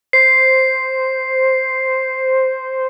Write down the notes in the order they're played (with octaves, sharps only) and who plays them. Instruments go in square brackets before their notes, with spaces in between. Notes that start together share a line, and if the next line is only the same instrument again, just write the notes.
[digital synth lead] C5 [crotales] C7